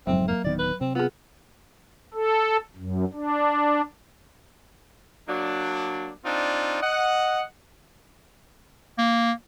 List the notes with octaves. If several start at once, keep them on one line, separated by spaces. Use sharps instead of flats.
F#1 F2 G#2 F#3 C4
A#3
D1 D#3 B3 D5
B4
C3 C4
B3 F4 G#4
A4
F#2
D4
F#3 A#3 D4
C4 D4 D#4 F4 D5
D#5 F#5
A#3